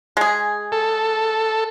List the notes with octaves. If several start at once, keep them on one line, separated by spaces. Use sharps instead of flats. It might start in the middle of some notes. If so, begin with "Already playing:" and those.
G#3 G#4
A4